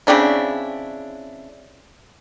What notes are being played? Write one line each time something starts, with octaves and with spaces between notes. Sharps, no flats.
C#3 C4 D4 E4